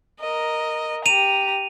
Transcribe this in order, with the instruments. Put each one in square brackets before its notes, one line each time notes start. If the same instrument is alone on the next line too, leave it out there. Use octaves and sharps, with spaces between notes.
[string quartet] A#4 D#5
[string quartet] G4 A#5 [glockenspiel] D#7 F7